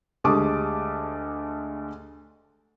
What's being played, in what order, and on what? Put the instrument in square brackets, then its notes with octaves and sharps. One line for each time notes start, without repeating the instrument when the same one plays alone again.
[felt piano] D2 G#3 G4 A5 D6 D#6